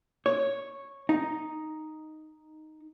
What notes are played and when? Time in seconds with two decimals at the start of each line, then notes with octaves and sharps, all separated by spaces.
0.26 C#5
1.09 D#4